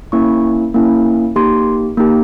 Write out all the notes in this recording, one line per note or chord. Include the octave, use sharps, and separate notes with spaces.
A#3 C#4 E4 C#6
A#3 C#4 E4
A#3 D#4 G4 C6
A#3 D#4 G4